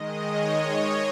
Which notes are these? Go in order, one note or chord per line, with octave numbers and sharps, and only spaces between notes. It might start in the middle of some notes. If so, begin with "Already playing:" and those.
Already playing: D#3 G#3 D#5
C#5